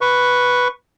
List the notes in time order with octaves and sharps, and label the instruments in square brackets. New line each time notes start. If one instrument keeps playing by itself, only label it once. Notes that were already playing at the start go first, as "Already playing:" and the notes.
[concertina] B4 C#6